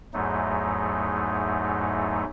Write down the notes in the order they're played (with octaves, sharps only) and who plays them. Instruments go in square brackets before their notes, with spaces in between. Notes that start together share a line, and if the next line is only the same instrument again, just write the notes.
[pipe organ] E2 G#2 F#3 A3 D#4